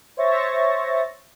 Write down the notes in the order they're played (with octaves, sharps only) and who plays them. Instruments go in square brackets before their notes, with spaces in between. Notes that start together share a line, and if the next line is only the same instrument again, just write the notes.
[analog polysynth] C5 C#5 E5 C#6 A6 A#6